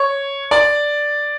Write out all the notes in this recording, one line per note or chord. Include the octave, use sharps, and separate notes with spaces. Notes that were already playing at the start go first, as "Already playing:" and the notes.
Already playing: C#5
D5